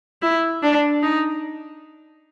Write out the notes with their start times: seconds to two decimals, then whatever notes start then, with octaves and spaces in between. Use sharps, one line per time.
0.22 E4
0.63 D4
1.03 D#4